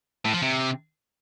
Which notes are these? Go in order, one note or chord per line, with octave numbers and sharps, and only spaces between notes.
A2
F3
C3